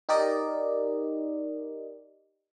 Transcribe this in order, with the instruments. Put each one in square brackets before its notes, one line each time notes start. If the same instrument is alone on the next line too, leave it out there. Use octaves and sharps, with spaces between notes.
[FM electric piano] D#4 G4 A#4 D5 D#5